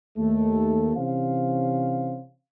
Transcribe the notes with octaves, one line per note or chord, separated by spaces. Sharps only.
D#2 A3
C3 E3 C#4 C5 F5